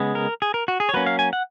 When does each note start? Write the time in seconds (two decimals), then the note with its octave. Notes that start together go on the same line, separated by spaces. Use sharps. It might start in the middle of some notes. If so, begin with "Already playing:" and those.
Already playing: C#3 G#3 B3
0.15 A#4
0.42 G#4
0.54 A#4
0.68 F#4
0.80 G#4
0.89 C#5
0.94 F#3 A#3 C#4 B4
1.06 F5
1.19 G#5
1.33 F#5